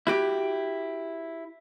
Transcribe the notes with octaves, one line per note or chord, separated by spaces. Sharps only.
E4 F#4 G4